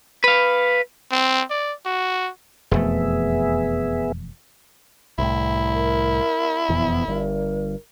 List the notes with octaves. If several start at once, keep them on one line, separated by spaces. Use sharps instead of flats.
B4 F5
C4
D5
F#4
E1 F2 A3 B3 G#4 E5
C2 A2 E4
A#4
E1 F2 E3 B3
G1 G2 A#4